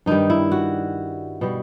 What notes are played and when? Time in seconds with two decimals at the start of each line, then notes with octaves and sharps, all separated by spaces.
0.06 G2 D#3 G3 D#4
0.30 E4
0.52 F#4
1.41 B2 G3